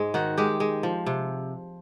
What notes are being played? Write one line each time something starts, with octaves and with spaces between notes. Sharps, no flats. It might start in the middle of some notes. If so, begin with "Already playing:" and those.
Already playing: G#2 G#3
D#3 F#4
G#3 G4
G#3
F3
C3